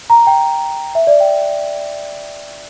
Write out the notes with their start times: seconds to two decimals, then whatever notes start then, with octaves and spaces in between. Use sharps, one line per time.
0.10 A#5
0.27 G5
0.95 E5
1.07 D5
1.20 G5